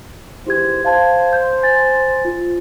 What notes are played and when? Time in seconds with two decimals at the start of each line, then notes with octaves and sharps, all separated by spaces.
0.46 G#1 E3 E4 G4 C5 G#6
0.85 C5 F5 A5 G#6
1.33 G6
1.63 G#5 A6
2.25 F4